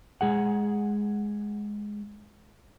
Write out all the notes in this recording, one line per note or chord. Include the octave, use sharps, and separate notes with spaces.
G#3 G#4 F#5